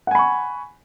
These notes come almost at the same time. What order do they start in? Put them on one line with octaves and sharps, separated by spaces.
F#5 G#5 B5 C#6